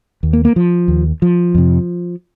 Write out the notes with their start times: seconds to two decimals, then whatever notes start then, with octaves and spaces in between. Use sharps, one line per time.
0.23 D#2
0.33 A#3
0.45 A#3
0.56 F3
0.88 D#2
1.22 F3
1.55 F2 C3